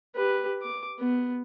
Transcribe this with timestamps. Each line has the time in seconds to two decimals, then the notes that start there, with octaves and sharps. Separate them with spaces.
0.16 G4 B4
0.62 D6
0.99 B3